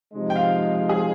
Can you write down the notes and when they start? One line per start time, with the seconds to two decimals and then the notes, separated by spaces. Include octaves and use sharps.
0.14 C3 F3 G#3 D#4
0.30 G5
0.35 F4 F5
0.89 G#4